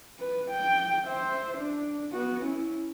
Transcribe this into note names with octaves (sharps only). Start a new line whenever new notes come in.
B4
G5
C5 E5
D4
B3 F#4
C#4 E4